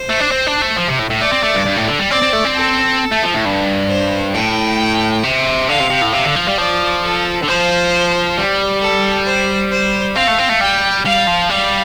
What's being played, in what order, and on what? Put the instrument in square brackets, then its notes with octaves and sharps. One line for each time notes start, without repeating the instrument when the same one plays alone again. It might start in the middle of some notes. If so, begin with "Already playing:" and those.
Already playing: [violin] C5
[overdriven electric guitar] A3
D4
C4
D4
A3
F3
C3
A2
A2
[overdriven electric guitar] A3 [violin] D5
[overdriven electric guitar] C4
A3
G2
G2
A2
D3
G3
[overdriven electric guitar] C4 [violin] D5
[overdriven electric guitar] C4
A3
C4
[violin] A4
[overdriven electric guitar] A3
F3
A2
G2
[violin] C5
[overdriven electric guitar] A2 [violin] G5
[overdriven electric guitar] C3
[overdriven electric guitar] D3 [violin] F5
[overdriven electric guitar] C3
C3
A2
[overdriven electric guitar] C3 [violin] F5
[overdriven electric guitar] D3
F3
G3
[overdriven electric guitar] F3 [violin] D5
[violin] A4
[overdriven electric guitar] D3
[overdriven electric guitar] F3 [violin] C5
[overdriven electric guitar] G3
[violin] A4
C5
C5
[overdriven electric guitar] C4 [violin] F5
[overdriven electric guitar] A3
C4
A3
[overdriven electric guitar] G3 [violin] G5
[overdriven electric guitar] G3 [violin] F5
[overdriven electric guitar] F3
[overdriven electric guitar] G3 [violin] F5